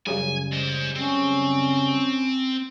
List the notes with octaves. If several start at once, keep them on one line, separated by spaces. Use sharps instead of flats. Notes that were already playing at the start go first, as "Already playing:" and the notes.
F#2 C#3 G3 G#5
G#3 C5
C4 C#4